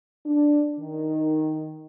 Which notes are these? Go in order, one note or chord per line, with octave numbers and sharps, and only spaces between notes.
D4
D#3